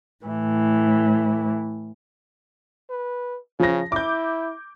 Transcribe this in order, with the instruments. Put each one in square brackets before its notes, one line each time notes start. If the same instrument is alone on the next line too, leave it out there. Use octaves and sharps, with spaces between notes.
[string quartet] A2 E3
[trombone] B4
[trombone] C#3 [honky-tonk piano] F3 A#6
[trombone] E4 [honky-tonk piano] D6 G6